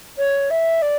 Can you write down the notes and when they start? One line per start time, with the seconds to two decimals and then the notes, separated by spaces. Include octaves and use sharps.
0.18 C#5
0.50 E5
0.82 D5